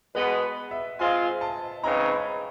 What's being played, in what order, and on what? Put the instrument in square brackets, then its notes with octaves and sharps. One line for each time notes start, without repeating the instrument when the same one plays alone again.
[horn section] B2 G#3 B3 [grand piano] B4
[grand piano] E5
[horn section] G#3 C4 F4 [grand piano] G#5
[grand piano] A5
[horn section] C#3 E3 G#3 C4 D#4 [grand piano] A#5
[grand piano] B5